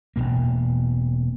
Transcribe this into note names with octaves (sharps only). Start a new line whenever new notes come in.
E1 F2 B2 A#3